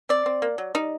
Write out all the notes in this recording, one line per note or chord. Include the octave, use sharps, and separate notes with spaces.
C4 D5
C4
A#3
F#3
G3 D#4